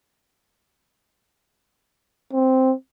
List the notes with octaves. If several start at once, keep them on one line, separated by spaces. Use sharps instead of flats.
C4